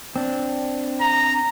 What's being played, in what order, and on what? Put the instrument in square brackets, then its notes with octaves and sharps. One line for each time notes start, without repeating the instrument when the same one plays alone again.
[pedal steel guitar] C4 D4
[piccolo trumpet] A#5